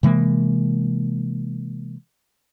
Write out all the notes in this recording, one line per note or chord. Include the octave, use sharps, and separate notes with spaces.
C3 E3 G#3 A#3